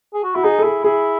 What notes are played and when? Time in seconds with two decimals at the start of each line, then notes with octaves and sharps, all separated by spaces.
0.14 G#4
0.24 F#4
0.34 E4 F#4
0.44 D#4 G#4
0.59 A4
0.63 E4 G#4
0.84 E4 G#4